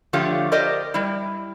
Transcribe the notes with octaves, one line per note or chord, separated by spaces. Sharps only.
D3 F3 A3 F4 G4 C#5
G4 A#4 C5 D5 D#5
G3 E4